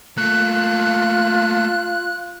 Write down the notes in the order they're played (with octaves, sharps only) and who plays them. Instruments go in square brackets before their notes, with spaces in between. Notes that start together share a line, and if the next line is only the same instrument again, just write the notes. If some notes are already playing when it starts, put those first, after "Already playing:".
[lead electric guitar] A3 A#3 [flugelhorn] F4 [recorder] F#6